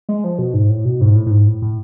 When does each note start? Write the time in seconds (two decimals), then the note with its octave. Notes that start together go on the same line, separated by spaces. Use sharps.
0.09 G#3
0.24 F3
0.39 B2
0.54 G#2
0.70 A2
0.85 B2
1.01 G#2
1.15 A2
1.26 A2
1.31 G#2
1.47 A2
1.62 A2